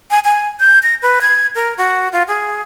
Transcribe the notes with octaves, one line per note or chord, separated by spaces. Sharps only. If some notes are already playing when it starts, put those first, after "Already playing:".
G#5
G#5
G6
A#6
B4
G#6
A#4
F#4
F4
G#4